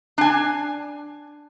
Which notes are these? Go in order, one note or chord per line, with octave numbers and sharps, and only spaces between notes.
D4 G#5